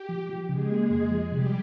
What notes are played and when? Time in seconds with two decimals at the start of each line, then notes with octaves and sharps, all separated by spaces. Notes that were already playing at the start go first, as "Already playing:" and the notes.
Already playing: G4
0.09 F3
0.30 F3
0.49 C#3 G#3 G#4
0.71 A#3
0.90 F2
1.12 F3
1.32 C3 G3 G4